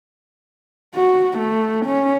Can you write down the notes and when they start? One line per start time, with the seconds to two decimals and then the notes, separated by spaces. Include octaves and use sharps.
0.95 F#4
1.38 A3
1.86 C#4